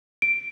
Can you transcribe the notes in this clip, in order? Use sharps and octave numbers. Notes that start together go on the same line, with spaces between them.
D7